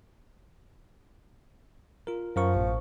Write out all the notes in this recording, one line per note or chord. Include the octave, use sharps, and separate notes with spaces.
F4 A#4
F#2 F3 A#4 C#6
A1 A2